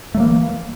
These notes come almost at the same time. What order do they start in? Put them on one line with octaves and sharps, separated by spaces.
A3 F#3 A#3 E3